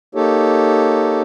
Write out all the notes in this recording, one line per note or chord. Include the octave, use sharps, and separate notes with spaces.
A#3 D#4 G4 A4 C#5